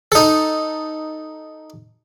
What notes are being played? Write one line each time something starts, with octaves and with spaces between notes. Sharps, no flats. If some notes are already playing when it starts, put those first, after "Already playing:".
D#4 A4